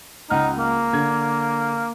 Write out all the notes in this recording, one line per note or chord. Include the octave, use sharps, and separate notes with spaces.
C#2 D#4 F#5 F6
A#3
D3 G#6